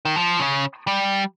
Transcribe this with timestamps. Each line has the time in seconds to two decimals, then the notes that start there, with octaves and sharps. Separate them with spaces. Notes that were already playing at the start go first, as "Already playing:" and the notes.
0.05 D#3
0.16 F3
0.39 C#3
0.87 G3